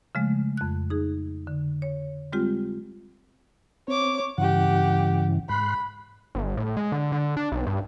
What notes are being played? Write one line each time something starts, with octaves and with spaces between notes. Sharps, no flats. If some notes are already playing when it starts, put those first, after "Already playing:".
C#3 F3 G#3 A3
F2 F#6
D#4 G#4
D3
C#5
G3 G#3 C4 F4 G4
C4 C#5 D6
G2 C#3 E3 G4 F#5
G#2 B5 C6 F#6
G1
A2
G#3
D3
D3
D4
B1
G2